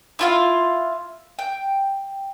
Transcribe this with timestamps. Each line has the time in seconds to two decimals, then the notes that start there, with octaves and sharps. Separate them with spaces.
0.19 E4 F4 F5
1.39 G5